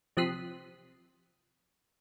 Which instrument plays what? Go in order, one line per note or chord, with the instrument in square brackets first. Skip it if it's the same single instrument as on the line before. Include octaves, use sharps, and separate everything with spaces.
[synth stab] C3 F3 D#6 F#6 B6 C7